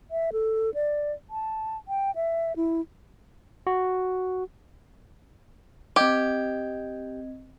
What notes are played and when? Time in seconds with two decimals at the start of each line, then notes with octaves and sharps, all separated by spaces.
0.11 E5
0.33 A4
0.74 D5
1.30 A5
1.88 G5
2.16 E5
2.56 E4
3.67 F#4
5.96 C4 G4 D#5 G#6